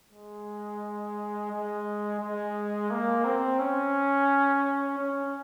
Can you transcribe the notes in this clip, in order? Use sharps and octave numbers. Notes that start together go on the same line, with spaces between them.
G#3
G#3
G#3
A#3
C4
C#4
C#4